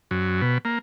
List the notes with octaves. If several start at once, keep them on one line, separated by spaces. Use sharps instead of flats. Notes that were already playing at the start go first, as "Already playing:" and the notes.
F#2
B2
A#3